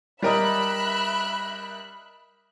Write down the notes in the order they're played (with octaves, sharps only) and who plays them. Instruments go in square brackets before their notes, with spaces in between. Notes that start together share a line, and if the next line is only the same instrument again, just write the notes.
[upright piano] G3 A#4 D#5 [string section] E5 B5 F#6